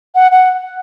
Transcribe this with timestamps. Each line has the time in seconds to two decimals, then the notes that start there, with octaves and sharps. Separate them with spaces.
0.15 F#5
0.32 F#5